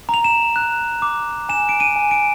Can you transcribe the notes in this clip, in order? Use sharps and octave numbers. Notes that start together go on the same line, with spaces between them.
A#5 F7
E7
F#6
D6
G#5 E7
D7
D#7
G#5
D7